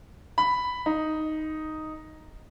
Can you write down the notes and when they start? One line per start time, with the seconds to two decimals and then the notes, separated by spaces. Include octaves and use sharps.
0.38 B5
0.86 D#4